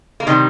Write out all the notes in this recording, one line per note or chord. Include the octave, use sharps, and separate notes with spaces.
A#3
C3 D#3 G3 C4